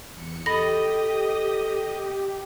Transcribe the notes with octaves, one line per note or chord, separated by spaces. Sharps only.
E2 C#7
G4 A4 D#5 B5 A#6